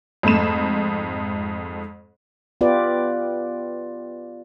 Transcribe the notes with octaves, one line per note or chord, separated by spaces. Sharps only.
F2 G#2 A3 B5 E7
B3 F4 G4 B4 D5